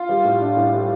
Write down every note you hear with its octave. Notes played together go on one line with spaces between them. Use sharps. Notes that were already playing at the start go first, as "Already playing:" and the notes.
Already playing: F4
G3
A2
D4
A2
G3